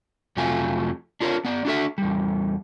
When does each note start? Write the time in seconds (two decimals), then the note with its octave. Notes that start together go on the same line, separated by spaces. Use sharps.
0.37 F2 C3 F#3 A3 F4 G#5
1.21 D4 F4 A#4 B4 C#5
1.45 B3 D5
1.65 D4 F#4 A4 E5
1.98 E2 G3